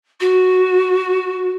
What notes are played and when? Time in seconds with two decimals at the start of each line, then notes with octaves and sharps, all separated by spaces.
0.20 F#4